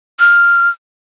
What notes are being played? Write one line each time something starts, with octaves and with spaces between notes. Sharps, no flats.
F6